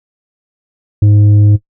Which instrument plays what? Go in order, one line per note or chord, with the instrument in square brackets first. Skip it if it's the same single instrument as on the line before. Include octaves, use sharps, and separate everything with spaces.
[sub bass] G#2